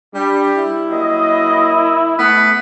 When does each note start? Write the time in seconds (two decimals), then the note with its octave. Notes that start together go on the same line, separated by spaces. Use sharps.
0.14 G3 D4
0.55 E4
0.91 F#3 A#3 D#5
2.19 A3 B3 A4 F#5